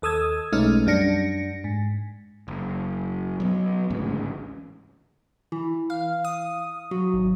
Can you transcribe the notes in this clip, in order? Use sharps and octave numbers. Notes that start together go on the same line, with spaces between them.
D#2 A4 D#6 E6 G#6
B1 G#3 A3 C#4 D#4 F6
F#2 G3 D4 A#6 C#7
G#2
F#1
F#3 A3 B3
A1 D2 G#2 C#3
E3
F5
D#6
F#3
G#1